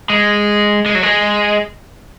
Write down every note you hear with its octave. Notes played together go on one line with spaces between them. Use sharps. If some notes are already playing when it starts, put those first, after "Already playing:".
G#3
G#3
F#3
G#3